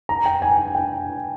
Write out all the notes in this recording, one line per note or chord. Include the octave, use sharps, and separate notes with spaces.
A#5
G5
G#5
G5